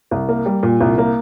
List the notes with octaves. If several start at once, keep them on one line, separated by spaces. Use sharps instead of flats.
C2
A#3
G3
A#2
C2
A#3